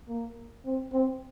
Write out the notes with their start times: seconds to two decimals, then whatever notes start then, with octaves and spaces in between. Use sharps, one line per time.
0.09 A#3
0.66 C4
0.93 C4